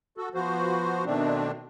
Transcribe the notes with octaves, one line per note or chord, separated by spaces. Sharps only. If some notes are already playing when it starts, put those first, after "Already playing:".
F#4 A4
F3 B3 F#4 C5
B2 D#3 A3 C4 D4